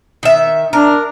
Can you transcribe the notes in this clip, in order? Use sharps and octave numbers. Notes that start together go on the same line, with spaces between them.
D#3 E5
D4 A#4